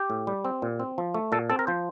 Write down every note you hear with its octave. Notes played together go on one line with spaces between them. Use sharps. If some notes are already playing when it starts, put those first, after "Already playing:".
Already playing: G4
A2
G3
C4
A#2
C4
F3
A3
A#2 A4
C4 A4
A#4
F3 C5